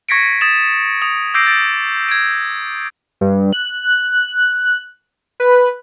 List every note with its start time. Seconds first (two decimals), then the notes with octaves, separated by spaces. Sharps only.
0.09 C#6 G#6 A#6 B6 C#7 D7
0.41 D#6 A6 E7
1.01 D#6 F7
1.34 D6 E6 G6 A#6 C7 D7
1.47 A6 D7
2.09 G#6 D7
3.21 G2
3.53 F#6
5.40 B4